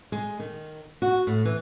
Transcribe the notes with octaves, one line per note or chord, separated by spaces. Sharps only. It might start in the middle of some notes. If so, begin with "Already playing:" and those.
G#3
D#3
F#4
A2
E3